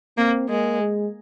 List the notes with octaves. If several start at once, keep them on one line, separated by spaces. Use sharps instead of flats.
A#3 C4
G#3 A#3
G#3